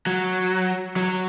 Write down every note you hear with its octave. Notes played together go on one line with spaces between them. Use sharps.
F#3
F#3